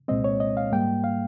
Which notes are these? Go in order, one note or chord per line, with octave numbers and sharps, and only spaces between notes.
C2 A#2 G#3 C4 D#5
C#5
D#5
F5
G#2 G3 A#3 G5
F5